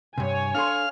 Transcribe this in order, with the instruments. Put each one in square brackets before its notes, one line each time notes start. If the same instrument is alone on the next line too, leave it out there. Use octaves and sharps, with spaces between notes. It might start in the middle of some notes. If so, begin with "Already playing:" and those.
[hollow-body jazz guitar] G2 C3 [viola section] C#5 G#5
[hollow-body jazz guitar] D4 A4 C6 [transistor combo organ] F5 F6